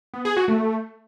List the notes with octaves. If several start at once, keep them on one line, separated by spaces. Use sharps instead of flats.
B3
G#4
F#4
A3